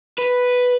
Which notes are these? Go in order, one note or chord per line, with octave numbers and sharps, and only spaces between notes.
B4